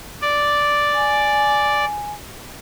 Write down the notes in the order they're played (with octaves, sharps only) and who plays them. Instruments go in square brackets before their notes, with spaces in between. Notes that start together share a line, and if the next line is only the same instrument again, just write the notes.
[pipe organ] D5
[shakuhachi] G#5